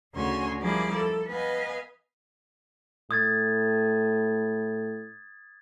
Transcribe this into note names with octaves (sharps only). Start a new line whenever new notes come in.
D2 C#3 F#4 C#5 G#5 C6
F3 G3 A#3 E4 G#4 D5
A4
B3 B4 D#5 F5 G#5
A2 D#6 G#6 A6